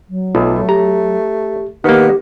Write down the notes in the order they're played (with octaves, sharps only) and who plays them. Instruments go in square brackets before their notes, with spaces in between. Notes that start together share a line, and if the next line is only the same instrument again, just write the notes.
[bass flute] F#3
[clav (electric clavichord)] B1 [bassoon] A3 [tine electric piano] F4
[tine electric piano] G4 [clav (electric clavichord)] A#5
[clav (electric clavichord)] D#3 A#3 [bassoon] B3 [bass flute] G4